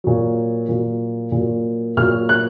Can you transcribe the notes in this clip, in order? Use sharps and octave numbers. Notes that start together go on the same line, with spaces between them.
A#2 F#3
A#2 F#3
A#2 F#3
A#2 F#3 F6
F#6